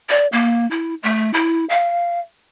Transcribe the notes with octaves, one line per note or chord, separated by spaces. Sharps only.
D5
A#3
E4
A3
E4
F5